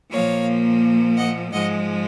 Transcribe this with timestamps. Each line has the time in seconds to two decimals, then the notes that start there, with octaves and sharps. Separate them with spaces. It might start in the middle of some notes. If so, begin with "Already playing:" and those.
0.12 A#2 F3 A#3 C#5 F5
1.17 D#5 F#5
1.52 G#2 F3 G#3 D#5 F#5